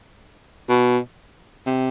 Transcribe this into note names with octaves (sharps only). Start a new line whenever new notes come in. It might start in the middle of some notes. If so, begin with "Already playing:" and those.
B2
C3